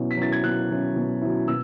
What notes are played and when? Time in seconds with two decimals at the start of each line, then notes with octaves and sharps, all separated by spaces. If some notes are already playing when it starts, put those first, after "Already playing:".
Already playing: B2 F#3 C#4 E4
0.11 B6
0.17 F#3 C#4 E4 A6
0.32 G#6
0.43 B2 F#6
0.70 F#3 C#4 E4
0.96 B2
1.22 F#3 C#4 E4
1.48 B2 E6